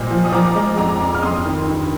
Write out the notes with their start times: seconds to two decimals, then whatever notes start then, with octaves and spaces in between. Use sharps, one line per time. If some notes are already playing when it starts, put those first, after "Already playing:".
Already playing: A#2 G3 C5 D#5
0.11 F3
0.25 D#6
0.32 F3 A#5 D6
0.55 G#3
0.78 F2 A#5 D6
1.00 F2
1.14 F6
1.22 F2 C6 D#6
1.46 D#3
1.68 G2